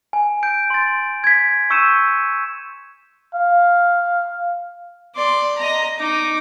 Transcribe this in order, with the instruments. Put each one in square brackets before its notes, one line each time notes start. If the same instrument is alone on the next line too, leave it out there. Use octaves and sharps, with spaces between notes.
[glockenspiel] G#5
G6 D7
C6 A6
G#6 B6
C#6 E6 G6 C#7 D#7 E7
[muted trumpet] F5
[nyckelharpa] D5 C6
D#5 A#5
D#4 D6